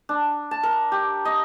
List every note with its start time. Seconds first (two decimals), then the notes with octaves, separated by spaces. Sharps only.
0.09 D4
0.51 A5
0.63 A#4
0.92 G4
1.25 D#5